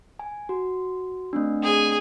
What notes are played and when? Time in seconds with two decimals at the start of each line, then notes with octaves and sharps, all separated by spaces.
0.19 G#5
0.49 F#4
1.33 A3 C4 D4
1.63 G#4 G#5